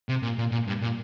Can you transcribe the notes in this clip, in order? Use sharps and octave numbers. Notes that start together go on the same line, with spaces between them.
C3
A#2
A#2
A#2
G2
A#2